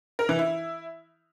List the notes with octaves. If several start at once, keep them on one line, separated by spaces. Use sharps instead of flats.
A#4
E3
E4